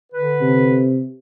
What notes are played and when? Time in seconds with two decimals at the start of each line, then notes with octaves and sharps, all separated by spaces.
0.12 D3 B4
0.41 C3